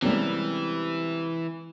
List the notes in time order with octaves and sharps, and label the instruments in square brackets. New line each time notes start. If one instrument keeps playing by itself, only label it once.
[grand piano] C3 G3 [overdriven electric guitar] E3 [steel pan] G#3 A#3 C#4